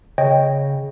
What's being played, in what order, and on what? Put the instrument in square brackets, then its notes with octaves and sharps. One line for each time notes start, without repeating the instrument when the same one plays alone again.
[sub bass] C#3 [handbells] C#5 D#5 G5